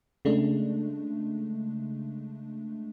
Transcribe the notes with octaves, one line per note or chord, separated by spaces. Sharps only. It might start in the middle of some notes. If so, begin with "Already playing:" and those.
C#3 G#3 A3 D4